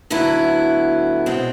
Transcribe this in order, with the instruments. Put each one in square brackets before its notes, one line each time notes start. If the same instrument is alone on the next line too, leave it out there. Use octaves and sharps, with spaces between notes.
[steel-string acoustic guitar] D2 D3 F#3 B3 E4
B2 G#3 C4